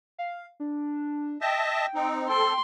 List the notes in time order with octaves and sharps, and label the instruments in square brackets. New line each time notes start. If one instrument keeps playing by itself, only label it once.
[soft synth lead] F5
D4
[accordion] D#5 E5 A5 [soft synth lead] G5
[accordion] C4 D#4
[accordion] C4 A4 [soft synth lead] G5 [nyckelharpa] C6